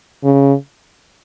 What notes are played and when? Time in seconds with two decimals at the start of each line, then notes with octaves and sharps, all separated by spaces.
0.23 C#3